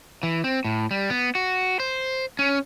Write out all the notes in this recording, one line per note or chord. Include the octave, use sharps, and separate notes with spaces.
E3
C4
A2
G3
B3
F#4
C5
C#4